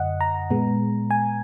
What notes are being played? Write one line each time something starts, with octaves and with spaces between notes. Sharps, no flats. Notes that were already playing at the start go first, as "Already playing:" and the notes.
Already playing: F#2 D3 D#5 F#5
A#5
A#2 G#3 B3
G#5